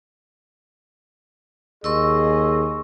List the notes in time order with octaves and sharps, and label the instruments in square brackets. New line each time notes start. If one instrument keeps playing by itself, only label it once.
[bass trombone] D#2 [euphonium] G#4 [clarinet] D#5 [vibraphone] C6 C#6 E6